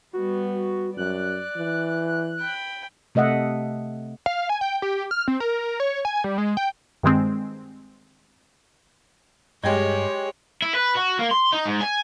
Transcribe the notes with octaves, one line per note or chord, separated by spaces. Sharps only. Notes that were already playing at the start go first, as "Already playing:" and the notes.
G3 B3 F#4
F#2 D5 F#6
E3
G5 B5
C3 A3 D#5 E5 F#5
F5
G#5
G5
G4
F6
C4
A#4
C#5
G#5
G3
G#3
G5
G2 D#3 G#3 C4
G2 G#3 G4 G#4 C#5 D#5 G5 G#6
E4
B4
F#4
A#3
C6
D#4
G#2
G#5